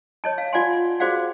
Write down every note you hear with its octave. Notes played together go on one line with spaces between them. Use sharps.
C#5 D#5 A5
F5
F4 D5 F5 F#5 G#5 C6
F#4 G#4 C5 D5 F5 F#5